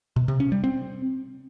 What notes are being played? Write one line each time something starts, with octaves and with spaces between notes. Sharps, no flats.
B2
C3
C#4
G3
C4